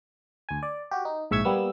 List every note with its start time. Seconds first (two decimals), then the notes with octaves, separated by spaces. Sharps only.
0.49 D2 G#5
0.63 D5
0.91 F#4 G4
1.05 D#4
1.31 A#1 G#2 E5 C#6 E6 G#6
1.45 G3 A#3 B3 E6